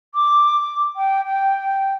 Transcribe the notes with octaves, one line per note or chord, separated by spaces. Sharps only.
D6
G5
G5